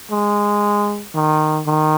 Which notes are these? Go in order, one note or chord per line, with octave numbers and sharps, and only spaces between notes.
G#3
D#3
D#3